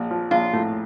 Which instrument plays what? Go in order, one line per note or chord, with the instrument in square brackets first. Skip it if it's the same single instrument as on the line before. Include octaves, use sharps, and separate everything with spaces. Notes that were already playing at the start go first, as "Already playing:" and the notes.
Already playing: [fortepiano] A#1
F3
[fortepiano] A#1 [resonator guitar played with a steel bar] F4
[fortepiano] A2